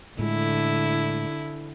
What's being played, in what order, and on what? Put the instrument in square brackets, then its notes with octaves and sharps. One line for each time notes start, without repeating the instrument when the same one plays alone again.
[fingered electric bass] A2 G#3 [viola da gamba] D3 E4